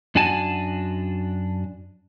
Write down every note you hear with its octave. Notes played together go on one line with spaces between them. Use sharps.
F#2 D4 F#4 G#5 A5